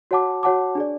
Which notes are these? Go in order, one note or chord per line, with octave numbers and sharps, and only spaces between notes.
F#4 C#5 F#5 A5 D6
F#4 C#5 F#5 A5 D6
D4 G#4 D5